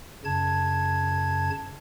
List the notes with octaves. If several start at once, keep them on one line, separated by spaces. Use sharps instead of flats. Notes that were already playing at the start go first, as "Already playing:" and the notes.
F#2 C#3 A5 G#6